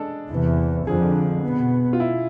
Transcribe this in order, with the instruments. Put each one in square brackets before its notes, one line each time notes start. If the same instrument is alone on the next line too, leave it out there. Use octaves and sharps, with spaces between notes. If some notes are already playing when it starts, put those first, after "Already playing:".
Already playing: [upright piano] G#3 D4 A4
[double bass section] E2 C3 E3
[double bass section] F2 D3 F3 [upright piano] G#4
[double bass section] B2 B3
[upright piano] F4
E4